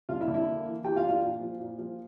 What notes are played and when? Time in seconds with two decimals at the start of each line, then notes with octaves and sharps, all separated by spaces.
0.09 D3 F4 F5
0.21 E4 E5
0.28 D3
0.34 E4 E5
0.46 A#3
0.66 E3
0.84 E3 G4 G5
0.96 F4 F5
1.03 D4
1.09 F4 F5
1.22 A#2
1.40 F3
1.60 A#2
1.78 F3